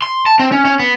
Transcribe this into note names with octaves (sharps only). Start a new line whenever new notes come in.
C6
A5
C4
C#4
C#4
B3